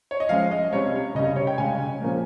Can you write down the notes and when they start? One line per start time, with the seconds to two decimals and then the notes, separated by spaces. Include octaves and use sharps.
0.11 C#5
0.20 D#5
0.29 F3 G#3 C#4 F5
0.51 D#5
0.73 C3 G3 C#4 C#5
1.15 C#3 G3 C#4 D#5
1.36 C#5
1.47 G5
1.58 C#3 G#3 C#4 G#5
2.01 A#2 F3 A#3 C#4